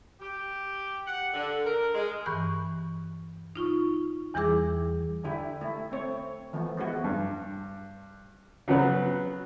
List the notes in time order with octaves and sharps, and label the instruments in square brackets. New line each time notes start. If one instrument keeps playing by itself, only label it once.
[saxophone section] G4
F#5
D3
A#4
G#3
[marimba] G2 E3 C#6 F#6
D#4 F4 C#6
E2 E3 G3 E4 G#4 D6
[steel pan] D3 D4 E4 G4
A3 E4
A3 C4 C#5
E3 F3 A3 B3
G#3 B3 E4 F#4
[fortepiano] G2
C#3 F#3 B3 B4